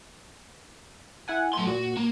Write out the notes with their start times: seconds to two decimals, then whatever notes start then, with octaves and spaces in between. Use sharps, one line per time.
1.28 E4 F#5 G#5
1.53 F#3 A3 C6
1.67 A#2 F#4
1.97 A#3